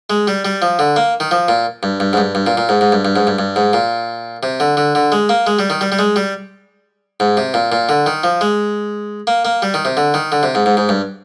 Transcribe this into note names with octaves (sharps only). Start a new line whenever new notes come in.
G#3
G3
G3
F3
D3
A#3
D#3
F3
A#2
G2
G2
G#2
G2
G2
A#2
A#2
G#2
G#2
G2
G2
G#2
G2
G2
G#2
A#2
C3
D3
D3
D3
G#3
A#3
G#3
G3
D#3
G3
G3
G#3
G3
G#2
C3
A#2
A#2
D3
D#3
F3
G#3
A#3
A#3
G3
D#3
C3
D3
D#3
D3
C3
G#2
G#2
G#2
G2